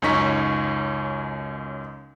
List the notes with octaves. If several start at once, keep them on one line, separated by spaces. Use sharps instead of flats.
C#2 F#2 C#4 D#4 C#6 B6